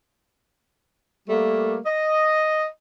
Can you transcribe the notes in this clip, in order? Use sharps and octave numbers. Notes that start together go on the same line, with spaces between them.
G3 A3 A#3
D#5